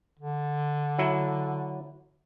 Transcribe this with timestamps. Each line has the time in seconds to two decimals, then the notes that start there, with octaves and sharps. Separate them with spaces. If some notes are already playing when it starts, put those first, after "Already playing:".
0.19 D3
0.98 F#3 E4